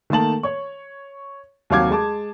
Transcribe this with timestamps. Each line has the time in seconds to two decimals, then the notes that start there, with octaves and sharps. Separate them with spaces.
0.10 D#3 A3 A#3 A5 F#7
0.43 C#5 C#6
1.70 D#2 C3 F#3 F5 D6 G#6
1.91 G#3 A5 D6